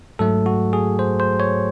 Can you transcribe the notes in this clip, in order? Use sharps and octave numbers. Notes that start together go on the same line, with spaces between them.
G#2 F#3 A3 A4
F#4
G#4
C5
C5
C#5